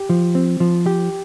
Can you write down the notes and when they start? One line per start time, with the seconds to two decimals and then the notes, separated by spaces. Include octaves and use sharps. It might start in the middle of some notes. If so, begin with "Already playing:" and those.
Already playing: G4
0.10 F3
0.35 C4
0.60 F3
0.86 G4